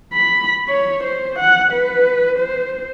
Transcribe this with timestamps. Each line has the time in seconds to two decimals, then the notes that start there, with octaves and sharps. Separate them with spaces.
0.14 B5
0.68 C#5
1.04 C5
1.39 F#5
1.72 B4
2.39 C5